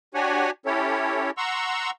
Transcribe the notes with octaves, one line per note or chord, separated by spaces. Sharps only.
D4 F#4 G4 C#5 F#5 G#5
C#4 E4 G4 A4 C#5
F#5 A#5 C6 C#6 E6